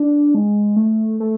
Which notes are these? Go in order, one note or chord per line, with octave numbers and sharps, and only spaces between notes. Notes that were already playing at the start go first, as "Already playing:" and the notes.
Already playing: D4
G#3
A3
A3